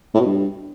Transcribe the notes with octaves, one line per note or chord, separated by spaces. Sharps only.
A2
B2
G2